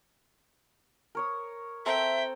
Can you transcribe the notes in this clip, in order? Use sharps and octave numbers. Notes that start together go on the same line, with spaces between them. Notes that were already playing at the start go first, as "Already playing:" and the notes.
A#4 C#5 D#6
C4 A4 E5 G5 A#5